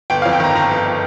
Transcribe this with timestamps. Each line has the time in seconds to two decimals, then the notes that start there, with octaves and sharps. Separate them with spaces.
0.10 G1 G5
0.22 F5
0.25 F2
0.33 G5
0.40 D#3 A#5
0.55 G1 A#5
0.71 G1